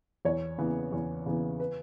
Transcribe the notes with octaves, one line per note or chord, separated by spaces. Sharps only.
E2 C#5
C#3 E3 B3
E2
C#3 E3 B3
B4